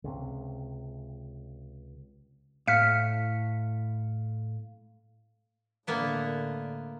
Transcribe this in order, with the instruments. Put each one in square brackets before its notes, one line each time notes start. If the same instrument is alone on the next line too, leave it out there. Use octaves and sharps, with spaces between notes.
[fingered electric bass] C#2 C3
[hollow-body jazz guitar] A2 [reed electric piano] F5 [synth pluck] F6 B6 C#7
[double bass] A2 D3 [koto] A#3 B3 E4